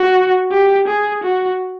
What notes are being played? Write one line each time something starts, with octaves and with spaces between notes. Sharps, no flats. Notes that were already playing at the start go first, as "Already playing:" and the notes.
Already playing: F#4
G4
G#4
F#4